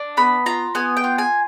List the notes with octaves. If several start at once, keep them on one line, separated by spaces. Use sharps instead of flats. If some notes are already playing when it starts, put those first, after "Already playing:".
Already playing: D4
B3 B5
F4 A#5
B3 G#5
G5
F4
G#5